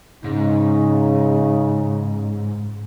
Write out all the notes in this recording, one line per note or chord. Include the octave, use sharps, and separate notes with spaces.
G#2 C#3 D#4